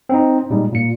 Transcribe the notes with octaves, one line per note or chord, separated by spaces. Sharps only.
C4 D#4
A#2 G3 G#3 D#4
A#2 C#7